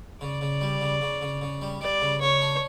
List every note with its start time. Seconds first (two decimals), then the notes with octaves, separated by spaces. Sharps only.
0.21 C#3 D5
0.41 C#3
0.61 G3
0.81 C#3
1.01 C#3
1.21 C#3
1.41 C#3
1.62 G3
1.81 G3 D5
2.01 C#3
2.21 C#3 C#5
2.41 D4